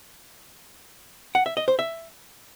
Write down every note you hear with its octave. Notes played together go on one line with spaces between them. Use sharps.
F#5
E5
D#5
C5
E5